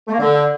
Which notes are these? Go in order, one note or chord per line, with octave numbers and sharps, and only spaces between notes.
A3
A#3
D3